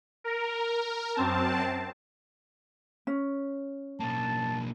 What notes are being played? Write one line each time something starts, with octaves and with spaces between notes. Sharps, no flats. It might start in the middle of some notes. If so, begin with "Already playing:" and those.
A#4
F#2 C4 A5
C#4
B1 A#3 A5